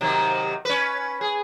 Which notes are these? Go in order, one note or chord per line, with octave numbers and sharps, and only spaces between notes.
C3 D#3 F#3
C#4 B4
G#4